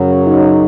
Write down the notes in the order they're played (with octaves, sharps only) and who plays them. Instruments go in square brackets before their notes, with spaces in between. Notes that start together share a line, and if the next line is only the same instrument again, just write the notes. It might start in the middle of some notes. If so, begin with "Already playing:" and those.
Already playing: [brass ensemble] F#2 C#3 F#3
D#4